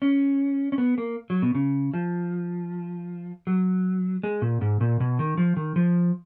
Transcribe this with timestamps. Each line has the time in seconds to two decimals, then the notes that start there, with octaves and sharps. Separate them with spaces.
0.02 C#4
0.72 C#4
0.78 B3
0.98 A#3
1.30 F#3
1.42 B2
1.55 C#3
1.94 F3
3.47 F#3
4.23 G#3
4.42 A#2
4.61 G#2
4.81 A#2
5.00 B2
5.19 D#3
5.37 F3
5.57 D#3
5.76 F3